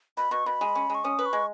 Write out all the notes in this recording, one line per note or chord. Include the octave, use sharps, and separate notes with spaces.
B2 B5
B2 C#6
B2 B5
G#3
C#4
G#3 C#6
C#4 D#6
B4
C#6
G#3